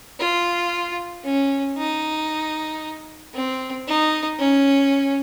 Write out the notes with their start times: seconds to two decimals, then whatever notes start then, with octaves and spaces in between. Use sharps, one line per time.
0.20 F4
1.24 C#4
1.78 D#4
3.34 C4
3.88 D#4
4.39 C#4